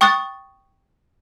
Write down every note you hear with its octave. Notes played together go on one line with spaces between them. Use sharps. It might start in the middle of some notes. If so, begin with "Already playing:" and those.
G5 C#6 D#6 F#6 A6